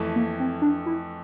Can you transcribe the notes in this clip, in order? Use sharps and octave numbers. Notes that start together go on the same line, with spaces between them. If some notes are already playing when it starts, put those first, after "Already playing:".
Already playing: F2 E3 A3
A#3
C4
D4
E4